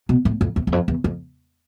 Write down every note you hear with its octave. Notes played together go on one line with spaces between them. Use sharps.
B2
A2
F2
E2
E2
F2
E2
F2